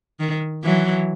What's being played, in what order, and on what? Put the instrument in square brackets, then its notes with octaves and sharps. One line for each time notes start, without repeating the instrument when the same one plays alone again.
[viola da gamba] D#3
E3 F#3